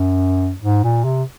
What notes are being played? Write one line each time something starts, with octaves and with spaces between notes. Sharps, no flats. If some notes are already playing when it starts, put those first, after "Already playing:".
Already playing: F#2
G#2
A#2
C3